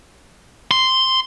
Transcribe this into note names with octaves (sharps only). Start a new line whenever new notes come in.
C6